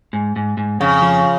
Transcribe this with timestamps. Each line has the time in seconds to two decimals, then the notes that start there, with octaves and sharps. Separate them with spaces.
0.13 G#2
0.36 G#2
0.57 G#2
0.80 F2 C#3
1.02 F3